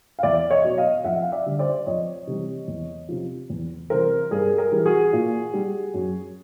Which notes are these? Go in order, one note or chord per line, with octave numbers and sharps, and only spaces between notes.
F5
E2 D5 E5
C#5 D#5
B2 F#3
D#5 F5
F2 E5 F#5
F5
D5 E5
D3 G3
C5 D5
F2 C#5 D#5
C3 E3 G3
E2
C3 F3
E2
C3 E3 G3 A#4 C5
G2 G#4 A#4
G#4 A#4
E3 G3
F#4 G#4
A#2
G3
F#2